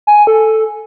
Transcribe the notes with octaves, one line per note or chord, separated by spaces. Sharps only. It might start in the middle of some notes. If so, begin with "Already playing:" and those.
G#5
A4